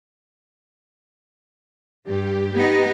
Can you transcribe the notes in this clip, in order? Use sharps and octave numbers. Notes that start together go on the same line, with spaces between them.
G2 G4
B3 D#4